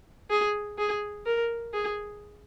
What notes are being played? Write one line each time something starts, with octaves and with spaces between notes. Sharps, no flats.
G#4
G#4
A#4
G#4